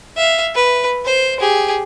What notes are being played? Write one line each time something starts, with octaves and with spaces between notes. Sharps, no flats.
E5 F5
B4
C5
G4 G#4